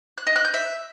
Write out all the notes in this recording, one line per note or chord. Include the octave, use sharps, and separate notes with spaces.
F#6
D#5
F#6
G6
E5